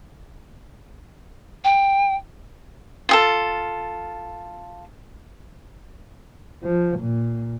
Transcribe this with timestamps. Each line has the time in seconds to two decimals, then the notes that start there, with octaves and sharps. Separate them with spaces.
1.64 G5
3.09 F4 G#4 A4
6.63 F3
7.00 A#2